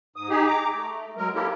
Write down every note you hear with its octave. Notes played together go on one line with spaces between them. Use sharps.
G#2 D#6
D#4 G4 G#4
A#5 D6
A3
F#3 G#3 A#4
A#3 C4 E4 G4 A4 A#4